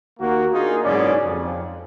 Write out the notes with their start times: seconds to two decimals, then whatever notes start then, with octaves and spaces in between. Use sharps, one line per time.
0.20 D#2 A#3 F#4
0.54 A#3 D4 D#4 F4 G#4
0.84 F#1 G#2 B2 C#4 G#4 D5
1.24 F2